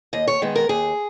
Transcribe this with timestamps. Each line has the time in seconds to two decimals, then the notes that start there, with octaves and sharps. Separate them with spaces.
0.13 D#2 D#5
0.27 C#5
0.42 D#3 G#3 B3
0.56 A#4
0.69 D#2 G#4